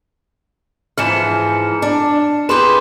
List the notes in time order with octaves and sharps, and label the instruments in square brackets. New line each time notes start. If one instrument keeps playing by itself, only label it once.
[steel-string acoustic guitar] G#2 E3 F3 [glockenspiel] F6 C#7 E7
[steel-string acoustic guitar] D4
[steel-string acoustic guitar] G4 G#4 B4 [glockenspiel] C6 E7